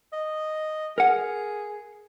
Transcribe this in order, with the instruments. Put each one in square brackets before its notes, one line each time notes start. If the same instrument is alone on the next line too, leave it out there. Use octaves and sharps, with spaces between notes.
[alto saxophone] D#5
[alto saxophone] G#4 [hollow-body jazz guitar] A#4 F#5